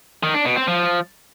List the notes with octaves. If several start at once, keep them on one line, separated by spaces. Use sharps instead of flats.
D#3
D4
B2
C4
F3